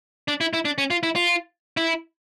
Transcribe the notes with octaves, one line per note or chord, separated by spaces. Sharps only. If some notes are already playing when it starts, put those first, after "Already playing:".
D4
E4
E4
D4
C#4
F4
E4
F4
E4